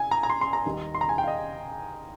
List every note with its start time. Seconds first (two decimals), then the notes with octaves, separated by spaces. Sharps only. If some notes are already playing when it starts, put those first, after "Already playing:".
Already playing: G#5
0.11 A#5
0.23 A#5
0.30 C6
0.41 C6
0.53 A#5
0.65 D#2 D#3 G3
0.95 C6
1.01 A#5
1.09 G#5
1.18 G5
1.23 F5
1.28 D#5